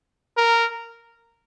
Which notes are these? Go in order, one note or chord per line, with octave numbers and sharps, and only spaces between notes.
A#4